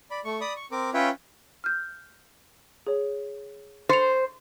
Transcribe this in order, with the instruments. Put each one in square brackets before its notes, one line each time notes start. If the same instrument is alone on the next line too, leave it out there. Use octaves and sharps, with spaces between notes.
[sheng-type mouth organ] D5 B5
A3 C#6
D5 B5 D#6
C#6
C4 A#4 D6
C#4 F4 B4 C#5 E5 G5
[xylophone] F6 G6
G#4 C#5
[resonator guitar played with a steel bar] C5 [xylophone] A6 C#7 F7